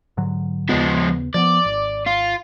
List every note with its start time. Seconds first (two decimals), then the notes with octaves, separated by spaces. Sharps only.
0.17 G#2 D3 F#3
0.69 D#2 C#3 F3 G#3 B3
1.34 F3 A#3 B3 D5
1.65 G#1
2.06 F4